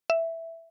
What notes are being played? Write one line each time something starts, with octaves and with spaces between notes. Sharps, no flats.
E5